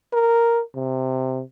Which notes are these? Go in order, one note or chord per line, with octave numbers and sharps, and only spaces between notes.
A#4
C3